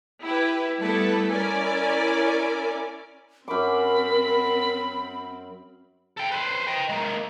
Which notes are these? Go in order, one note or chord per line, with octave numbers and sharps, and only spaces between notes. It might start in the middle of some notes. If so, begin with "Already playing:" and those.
E4 G4 B4
G3 A3 B3 E4 A4 B4
C#4 E4 A#4 D5 G#5
F#2 C4 A#4 B5 D6
A4 G5
B4 C5
D#5 G5
G#3 A#3